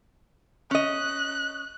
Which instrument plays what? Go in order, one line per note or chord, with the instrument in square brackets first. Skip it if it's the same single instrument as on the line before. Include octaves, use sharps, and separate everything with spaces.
[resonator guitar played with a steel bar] C#4 D#5 [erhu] F#6